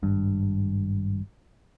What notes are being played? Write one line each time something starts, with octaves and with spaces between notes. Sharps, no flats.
G#1 G2